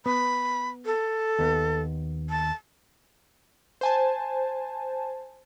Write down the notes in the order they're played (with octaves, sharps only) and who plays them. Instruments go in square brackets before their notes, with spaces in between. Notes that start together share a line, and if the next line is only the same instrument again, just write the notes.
[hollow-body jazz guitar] B3 [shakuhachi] B5
[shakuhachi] A4
[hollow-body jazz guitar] D#2 B3
[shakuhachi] A5
[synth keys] C5 G#5 A5